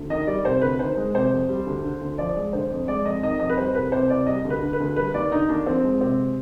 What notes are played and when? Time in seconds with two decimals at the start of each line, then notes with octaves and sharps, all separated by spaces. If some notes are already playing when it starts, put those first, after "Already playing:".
Already playing: D2
0.10 D#3 D#5
0.27 G3 D5
0.45 C3 C5
0.62 D2 B4
0.79 D#3 C5
0.97 G#3
1.14 C3 C5
1.32 F2
1.49 G3
1.67 D2
1.84 D3
2.01 D2
2.18 F3 D5
2.36 G#3
2.53 D3 C5
2.70 F2
2.88 G#3 D5
3.05 F2 D#5
3.23 D#3 D#5
3.40 F2 D#5
3.50 B4
3.57 G3 C5
3.75 C2 B4
3.92 C3 C5
4.10 C2 D5
4.27 G3 D#5
4.45 D2
4.50 B4
4.62 D3
4.73 B4
4.80 D2
4.96 G3 B4
5.14 D#2 D5
5.32 D3 D#4
5.49 D#2 D4
5.66 F3 C4
5.83 G#3
6.01 C3 C4